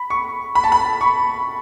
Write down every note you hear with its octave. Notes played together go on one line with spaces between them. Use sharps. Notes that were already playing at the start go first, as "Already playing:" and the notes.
Already playing: B5
C#6
B5
A5
B5
C#6